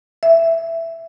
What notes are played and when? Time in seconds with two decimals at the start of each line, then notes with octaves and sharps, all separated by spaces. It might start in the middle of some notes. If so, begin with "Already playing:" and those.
0.23 E5